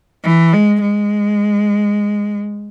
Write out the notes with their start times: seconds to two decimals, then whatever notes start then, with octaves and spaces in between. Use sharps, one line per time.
0.24 E3
0.53 G#3
0.81 G#3